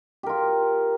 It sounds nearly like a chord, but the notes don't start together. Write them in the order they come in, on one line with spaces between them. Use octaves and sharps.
G4 A#4 F4